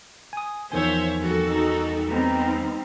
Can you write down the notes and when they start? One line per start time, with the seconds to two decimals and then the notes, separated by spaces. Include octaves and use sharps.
0.33 G#5 D#6
0.72 E2 D#3 F3 C5 C#5 E5 G#5
1.19 F2 G3 F#4 A4
1.49 D#4
2.07 G3 B3 C4 D#4